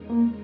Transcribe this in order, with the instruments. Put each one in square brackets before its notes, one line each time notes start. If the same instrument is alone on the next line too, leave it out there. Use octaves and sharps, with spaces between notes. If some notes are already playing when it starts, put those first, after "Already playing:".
Already playing: [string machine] E2 C#3 G#3 D#4 A#4
[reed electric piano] A#3